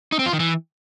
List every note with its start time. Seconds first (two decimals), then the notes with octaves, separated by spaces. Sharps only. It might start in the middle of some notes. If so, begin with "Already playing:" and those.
0.12 D#4
0.19 C4
0.26 F4
0.33 D#3
0.40 E3